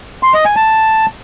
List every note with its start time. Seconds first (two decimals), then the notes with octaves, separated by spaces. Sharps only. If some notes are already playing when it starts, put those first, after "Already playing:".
0.23 C6
0.34 D#5
0.45 G#5
0.56 A5